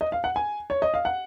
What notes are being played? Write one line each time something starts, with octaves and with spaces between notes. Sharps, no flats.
D#5
F5
F#5
G#5
C#5
D#5
F5
F#5